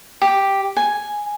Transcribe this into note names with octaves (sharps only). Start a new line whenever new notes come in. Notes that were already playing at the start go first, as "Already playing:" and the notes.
G4
G#5